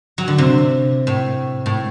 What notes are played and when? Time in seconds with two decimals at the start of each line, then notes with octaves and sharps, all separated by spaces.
0.18 F#3
0.28 D3
0.38 C3
1.07 A2
1.66 A2